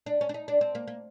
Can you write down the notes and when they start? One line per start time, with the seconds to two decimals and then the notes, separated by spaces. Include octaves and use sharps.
0.06 D4
0.21 C#4
0.29 D4
0.34 D#4
0.48 D4
0.61 C4
0.75 A#3
0.87 A#3